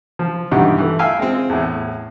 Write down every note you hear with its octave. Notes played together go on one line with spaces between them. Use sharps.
F3
B1 G2 D#3 E3 G4 F#5
E3 A3
E5 F5 G5 G#5 E6 F6
G#3 C4
E2 A2